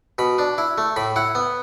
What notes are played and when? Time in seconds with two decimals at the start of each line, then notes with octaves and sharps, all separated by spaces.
0.18 B2 B5
0.38 D4
0.58 E4
0.78 A3
0.96 A2 B5
1.16 E4 F#5
1.35 B3